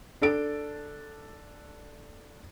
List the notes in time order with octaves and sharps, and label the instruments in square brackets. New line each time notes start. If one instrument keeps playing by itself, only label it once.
[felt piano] D4 A4 D7